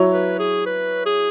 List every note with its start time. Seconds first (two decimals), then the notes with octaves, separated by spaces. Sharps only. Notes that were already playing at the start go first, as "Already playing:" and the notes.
Already playing: F#3 E4 C#5
0.13 B4
0.39 G#4
0.66 B4
1.06 G#4